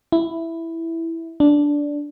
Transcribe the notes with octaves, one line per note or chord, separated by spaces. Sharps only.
E4
D4